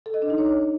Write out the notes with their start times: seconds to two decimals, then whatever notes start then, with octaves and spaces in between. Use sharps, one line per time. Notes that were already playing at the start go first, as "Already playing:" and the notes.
0.06 A4
0.14 D#5
0.22 D4
0.30 D#4
0.38 C#5